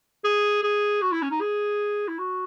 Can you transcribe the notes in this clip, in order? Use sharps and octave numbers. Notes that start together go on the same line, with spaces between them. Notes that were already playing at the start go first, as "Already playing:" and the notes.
G#4
G#4
F#4
E4
C#4
D#4
G#4
E4
F#4